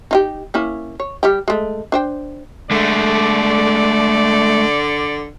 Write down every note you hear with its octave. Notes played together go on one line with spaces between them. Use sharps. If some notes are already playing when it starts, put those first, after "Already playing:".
D#4 F4 G4
A#3 C#4 E4
C#5
G3 G4 G5
G#3 A3
D4 C5 G5
D3 G#3 A3 D5